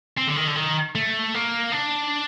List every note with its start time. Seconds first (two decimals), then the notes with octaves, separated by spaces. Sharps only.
0.17 C4
0.27 D3
0.36 D#3
0.47 D3
0.55 D#3
0.95 A3
1.35 A#3
1.72 D4